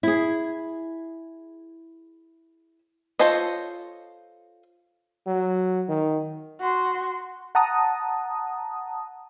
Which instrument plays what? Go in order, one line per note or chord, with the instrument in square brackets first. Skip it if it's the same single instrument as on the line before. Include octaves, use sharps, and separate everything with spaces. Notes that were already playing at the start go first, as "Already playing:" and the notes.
[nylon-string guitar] E4 G#4
[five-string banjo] F4 A4 C5 C#5 D#5
[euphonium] F#3
D#3
[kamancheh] F#4 C6
[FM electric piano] F#5 A5 A#5 D#6